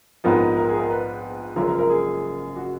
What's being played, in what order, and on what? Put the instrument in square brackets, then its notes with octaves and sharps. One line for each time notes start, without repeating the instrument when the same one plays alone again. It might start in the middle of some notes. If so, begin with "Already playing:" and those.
[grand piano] A#1 G#2 F3 B3 D#4 [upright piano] A#4
[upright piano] A#4
G#4
A#4
B4
[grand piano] F#1 F#2 F3 G#3 [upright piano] A#4
[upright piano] A#4
A#4
G#4
F#4